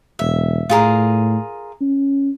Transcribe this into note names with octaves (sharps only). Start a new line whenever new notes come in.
E1 E5
A2 F4 G#4 A#4
C#4